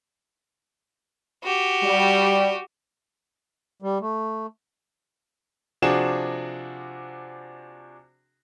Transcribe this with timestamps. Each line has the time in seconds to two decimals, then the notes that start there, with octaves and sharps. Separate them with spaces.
1.43 F#4 G4
1.83 G3
3.82 G3
4.01 A3
5.82 C3 F3 D4 F#4 G#4 E7